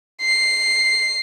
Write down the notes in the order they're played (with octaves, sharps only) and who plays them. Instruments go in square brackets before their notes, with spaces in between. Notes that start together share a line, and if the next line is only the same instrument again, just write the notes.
[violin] C7